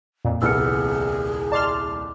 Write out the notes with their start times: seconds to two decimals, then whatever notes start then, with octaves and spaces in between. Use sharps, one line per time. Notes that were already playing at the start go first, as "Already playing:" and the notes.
0.25 F2 A#2
0.42 D#1 C2 B3 G#4 E6 F6 C#7
1.52 D5 D#5 A5 C6 D6 F6